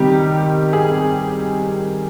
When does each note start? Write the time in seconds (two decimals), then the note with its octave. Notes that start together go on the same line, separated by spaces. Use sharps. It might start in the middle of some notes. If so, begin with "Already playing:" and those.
Already playing: C3 D#3 G3 G4
0.73 G#4